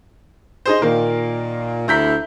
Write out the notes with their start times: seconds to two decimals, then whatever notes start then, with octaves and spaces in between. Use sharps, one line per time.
0.66 D#4 G#4 C5
0.82 A#2 D#3 A#3
1.88 D2 D3 E4 A#5 G6 B6